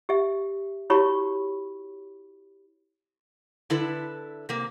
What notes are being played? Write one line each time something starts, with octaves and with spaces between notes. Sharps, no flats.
G4 E5
E4 F#4 G4 C#5 B5 C#6
D3 E4 A4 B4
C3 A#3